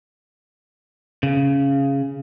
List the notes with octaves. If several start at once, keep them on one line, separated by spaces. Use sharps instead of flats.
C#3